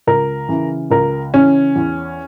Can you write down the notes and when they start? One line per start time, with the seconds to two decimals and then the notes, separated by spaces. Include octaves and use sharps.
0.07 C#2 A#4
0.48 C#3 E3
0.91 C#2 A#4
1.34 C#3 E3 C#4
1.76 E2